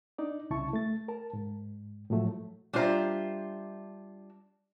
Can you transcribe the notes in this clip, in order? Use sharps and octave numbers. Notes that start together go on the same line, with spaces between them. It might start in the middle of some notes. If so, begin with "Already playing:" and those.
D4 D#4 D5
C2 C#3 E4 A5 C#6
A3 A6
A#4 A5
G#2
A2 F3 F#3 A3
G3 D4 F4 C5 E5 A#5